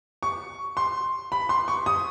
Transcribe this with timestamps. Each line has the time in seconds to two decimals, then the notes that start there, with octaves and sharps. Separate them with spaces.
0.23 C#6
0.77 C6
1.32 B5
1.49 C6
1.68 C#6
1.86 D#6